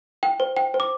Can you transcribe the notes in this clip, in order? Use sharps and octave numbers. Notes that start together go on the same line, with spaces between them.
G5
C5
G5
C5
D6